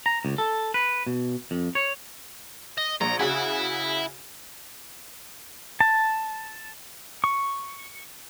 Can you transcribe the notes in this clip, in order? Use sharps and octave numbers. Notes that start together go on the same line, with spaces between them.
A#5
C#2
A4
B4
B2
F2
C#5
D#5
A#1 A#5
C#3 E4 F#4 G#4 E5
A5
C#6